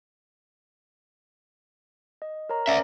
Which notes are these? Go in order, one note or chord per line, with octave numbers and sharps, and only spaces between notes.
D#5
A#4 C#5 A#5
C#4 D5 E5